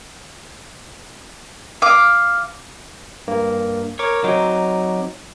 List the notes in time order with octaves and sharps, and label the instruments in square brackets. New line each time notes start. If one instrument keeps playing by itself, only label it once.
[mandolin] F5 D6
[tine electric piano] G2 A#3
[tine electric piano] A#4 D6 [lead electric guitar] C#5
[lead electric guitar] F#3 C4 [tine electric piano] D#4 C#5 D6